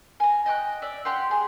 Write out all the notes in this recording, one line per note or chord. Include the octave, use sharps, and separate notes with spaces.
G#5 A#5
D#5 G5 C6 F#6
D5 E5
G4 F#5 G5 C6
G#4